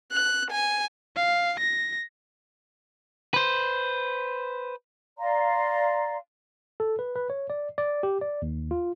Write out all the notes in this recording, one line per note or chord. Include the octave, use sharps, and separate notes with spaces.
F#6
G#5
F5
A#6
B4 C5
D5 F5 A#5 C6
A4
B4
B4
C#5
D5
D5
G4
D5
D#2
F4